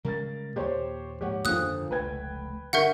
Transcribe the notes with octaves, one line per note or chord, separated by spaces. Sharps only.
C#3 G3 G#3 A#4 A6
D#2 A#2 G4 C5 C#5
G#2 F3 A#3 G4 C#5 F#5
G1 F2 A#2 D3 D#3 F3 D#6 F#6
F1 C#2 A3 B4 G5 G#6
G2 D3 A#4 E5 F#5 C#6 G6